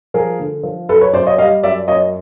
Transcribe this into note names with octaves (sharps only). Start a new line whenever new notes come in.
F3 G#4 A#4
D3
F3
F#2 A4 B4
B4 C#5
F#2 C5 D5
C#5 D#5
G3 D#5 F5
F#2 D5 E5
F#2 C#5 D#5